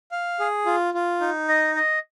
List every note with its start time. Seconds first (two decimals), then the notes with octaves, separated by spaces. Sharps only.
0.11 F5
0.40 G#4
0.66 F4
0.94 F4
1.21 D#4
1.48 D#5
1.75 D#5